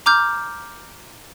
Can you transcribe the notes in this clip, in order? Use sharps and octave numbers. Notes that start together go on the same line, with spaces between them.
A#5 D6 F6 G6